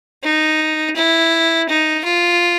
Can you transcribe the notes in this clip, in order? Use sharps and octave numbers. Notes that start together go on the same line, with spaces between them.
D#4
E4
D#4
F4